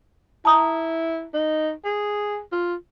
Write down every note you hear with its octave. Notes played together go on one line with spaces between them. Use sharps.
E4 A5 A#5 D#6
D#4
G#4
F4